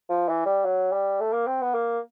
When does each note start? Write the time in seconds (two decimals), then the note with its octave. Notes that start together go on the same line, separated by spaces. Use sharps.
0.10 F3
0.29 E3
0.46 G3
0.65 F#3
0.92 G3
1.20 A3
1.33 A#3
1.47 C4
1.61 B3
1.75 A#3